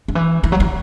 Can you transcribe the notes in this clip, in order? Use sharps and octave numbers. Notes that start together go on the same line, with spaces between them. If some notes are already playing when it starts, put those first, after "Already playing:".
D3
E3
E3
F#3
E3